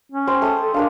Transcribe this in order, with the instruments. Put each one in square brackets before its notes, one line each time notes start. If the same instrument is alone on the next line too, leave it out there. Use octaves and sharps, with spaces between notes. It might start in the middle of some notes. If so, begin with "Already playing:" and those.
[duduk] C#4
[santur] G#3 C5 G5
A3 D#6
[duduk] A4
[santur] G#3 A#3 F5 [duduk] D4